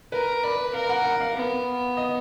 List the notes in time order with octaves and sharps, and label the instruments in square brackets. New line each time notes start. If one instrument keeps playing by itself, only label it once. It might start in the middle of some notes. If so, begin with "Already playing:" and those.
[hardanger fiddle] A#4 [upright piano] B4
[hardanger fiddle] B4 [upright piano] D5
[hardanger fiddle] A#4 [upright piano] F5
[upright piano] F#5
F#5
F5
[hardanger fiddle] B3
[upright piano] D#5